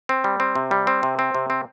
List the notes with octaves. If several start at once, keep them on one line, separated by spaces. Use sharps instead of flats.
C4
G3
C4
C3
G3
C4
C3
C4
C3
C4